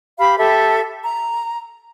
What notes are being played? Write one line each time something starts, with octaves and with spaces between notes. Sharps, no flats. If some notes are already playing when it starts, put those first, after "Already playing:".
G4 F5 B5
G4 A4 E5
A#5